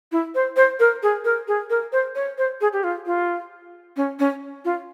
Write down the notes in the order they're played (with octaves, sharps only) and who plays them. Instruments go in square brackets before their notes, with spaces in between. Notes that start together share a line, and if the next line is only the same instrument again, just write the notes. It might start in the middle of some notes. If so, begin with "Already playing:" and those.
[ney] E4
C5
C5
A#4
G#4
A#4
G#4
A#4
C5
C#5
C5
G#4
G4
F4
F4
C#4
C#4
F4